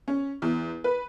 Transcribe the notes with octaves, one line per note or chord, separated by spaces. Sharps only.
C#4
E2
B4